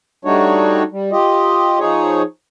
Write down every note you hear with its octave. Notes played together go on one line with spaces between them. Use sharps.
G3 A3 D4 D#4 F#4 C#5
G3
F4 G4 D#5
F3 D#4 G#4 C#5